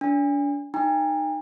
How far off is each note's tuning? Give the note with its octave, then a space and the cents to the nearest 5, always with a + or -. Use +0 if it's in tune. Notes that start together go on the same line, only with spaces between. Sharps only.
D4 -35 G#5 -40
D#4 -20 G5 +45 A#5 +0